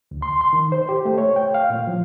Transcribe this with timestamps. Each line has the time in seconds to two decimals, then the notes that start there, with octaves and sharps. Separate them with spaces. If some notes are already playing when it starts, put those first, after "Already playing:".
0.11 D2
0.22 C6
0.41 C6
0.53 D#3
0.72 C5
0.89 G4
1.05 A3
1.18 C#5
1.36 G5
1.54 F5
1.70 A#2
1.87 F3